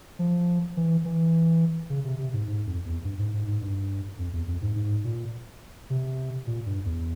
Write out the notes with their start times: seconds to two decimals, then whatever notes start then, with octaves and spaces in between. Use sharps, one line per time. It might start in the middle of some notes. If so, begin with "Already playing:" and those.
0.19 F3
0.77 E3
1.05 E3
1.90 C#3
2.05 C3
2.19 C3
2.33 G#2
2.48 G#2
2.66 F2
2.85 E2
3.04 G2
3.19 G#2
3.33 G#2
3.48 G#2
3.61 G2
4.19 F2
4.33 E2
4.47 F2
4.62 G#2
4.76 G#2
5.04 A#2
5.90 C3
6.47 A#2
6.66 G2
6.85 E2